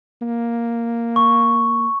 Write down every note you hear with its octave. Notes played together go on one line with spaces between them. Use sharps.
A#3
C#6